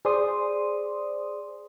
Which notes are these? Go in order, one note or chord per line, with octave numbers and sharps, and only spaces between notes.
G#4 C5 D5 C6 D#6